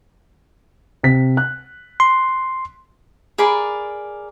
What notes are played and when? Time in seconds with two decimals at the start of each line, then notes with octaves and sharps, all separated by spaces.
1.03 C3 B6
1.37 F#6
2.00 C6
3.38 G#4 A#4 D5 B5